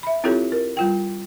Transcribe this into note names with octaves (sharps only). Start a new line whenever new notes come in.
E5 B5
C4 E4 F4 G4 A4 C#5
A#4
G3 F4 G5